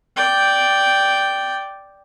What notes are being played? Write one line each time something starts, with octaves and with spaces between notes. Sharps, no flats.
D5 G5